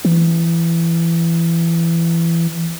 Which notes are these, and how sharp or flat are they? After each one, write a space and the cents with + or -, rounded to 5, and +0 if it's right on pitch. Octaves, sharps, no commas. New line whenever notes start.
E3 +20